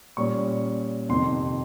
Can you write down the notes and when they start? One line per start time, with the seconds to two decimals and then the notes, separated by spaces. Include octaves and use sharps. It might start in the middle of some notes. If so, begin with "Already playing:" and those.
0.17 A#2 G3 C#4 C#6
1.09 F2 C3 D#3 C6